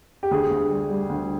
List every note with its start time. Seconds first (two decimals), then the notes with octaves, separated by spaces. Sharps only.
0.23 G4
0.31 D2 G#4
0.51 D2
0.70 G3
0.90 G3
1.09 D2